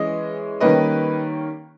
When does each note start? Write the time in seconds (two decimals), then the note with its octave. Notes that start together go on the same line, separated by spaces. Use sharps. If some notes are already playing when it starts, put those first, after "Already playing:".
Already playing: E3 G#3 C#4 D#5
0.60 D#3 G3 A#3 C#4 B4 D#5